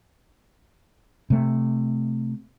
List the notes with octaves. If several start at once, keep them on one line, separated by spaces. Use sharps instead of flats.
C3 A3